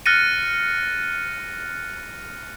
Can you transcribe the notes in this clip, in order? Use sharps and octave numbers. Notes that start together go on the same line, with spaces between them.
F6 F#6 A6 A#6 C#7 D#7